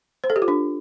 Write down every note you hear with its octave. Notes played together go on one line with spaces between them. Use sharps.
C5
A4
G4
F4
D4